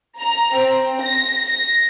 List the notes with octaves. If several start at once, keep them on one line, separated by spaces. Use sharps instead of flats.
A#5
C4
A#6
A#6